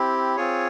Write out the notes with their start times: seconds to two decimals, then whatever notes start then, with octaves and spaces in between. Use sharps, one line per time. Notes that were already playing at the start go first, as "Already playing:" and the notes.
Already playing: C4 E4 G4
0.36 C4 F4 G#4 C#5